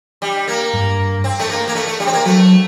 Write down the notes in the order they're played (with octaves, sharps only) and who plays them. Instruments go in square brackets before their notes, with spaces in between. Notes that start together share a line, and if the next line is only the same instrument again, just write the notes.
[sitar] G3
A#3
[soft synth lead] G2
[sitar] C4
A3
A#3
A#3
A3
A3
G3
C4
A#3
[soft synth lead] F#3 [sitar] A3